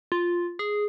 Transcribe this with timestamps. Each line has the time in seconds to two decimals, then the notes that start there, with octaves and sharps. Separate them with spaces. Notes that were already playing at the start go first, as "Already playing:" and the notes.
0.12 F4
0.59 G#4